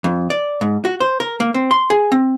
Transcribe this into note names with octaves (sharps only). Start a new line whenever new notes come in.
F2
D5
G#2
F#4
C5
A#4
A#3
C4
C6
G#4
C4